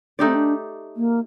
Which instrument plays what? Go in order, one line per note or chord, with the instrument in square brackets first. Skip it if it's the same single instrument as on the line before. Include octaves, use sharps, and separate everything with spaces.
[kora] A3 D#4 G4 D5 [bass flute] D4
[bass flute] C4
D4
A#3